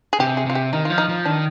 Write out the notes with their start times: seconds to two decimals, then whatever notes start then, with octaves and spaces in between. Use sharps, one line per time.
0.13 G#4
0.20 C3 G4
0.37 G#4
0.46 C3 F4
0.55 G4
0.73 D#3 D#4
0.85 F3 F4
0.98 D#4
1.09 F3
1.25 D#3 D4